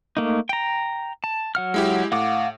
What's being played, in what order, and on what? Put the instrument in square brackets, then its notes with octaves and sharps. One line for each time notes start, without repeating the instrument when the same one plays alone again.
[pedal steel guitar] A3 A#3 D#4
G5 A#5
A5
F#3 F#5 F6
[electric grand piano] G#3 E4 G4
[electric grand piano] A2 [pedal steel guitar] F5 F#5 D6